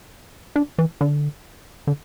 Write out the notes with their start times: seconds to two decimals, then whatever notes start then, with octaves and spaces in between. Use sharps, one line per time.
0.56 D4
0.78 E3
1.01 D3
1.87 D3